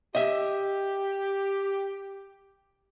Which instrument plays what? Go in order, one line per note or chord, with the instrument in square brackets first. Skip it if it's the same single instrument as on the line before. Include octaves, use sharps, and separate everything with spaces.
[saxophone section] G4 [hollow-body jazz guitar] D#5 E5